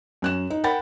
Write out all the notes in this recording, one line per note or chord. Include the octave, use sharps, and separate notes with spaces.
F#2 F#6 E7
D#4
A#4 F#5 G5 B5 A6